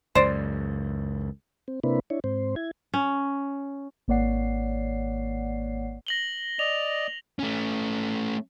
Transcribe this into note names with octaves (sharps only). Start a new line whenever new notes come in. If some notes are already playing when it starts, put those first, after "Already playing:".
C#2 F#2 C5 D5
C4
C3 A#3 C4 D4 E4 B4
D4 E4 C#5
G#2 C4 C5
E4 G#6
C#4
G#1 A#3 C#5 D5 F#5 C7
A#6 F#7 G7
D5 D#5 F7
A3 C#4